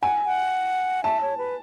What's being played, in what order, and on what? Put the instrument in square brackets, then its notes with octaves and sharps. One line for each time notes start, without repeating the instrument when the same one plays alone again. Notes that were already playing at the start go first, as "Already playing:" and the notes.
[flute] F#5 [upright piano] G#5
[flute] F#5
[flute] E5 [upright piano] A5
[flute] C#5
B4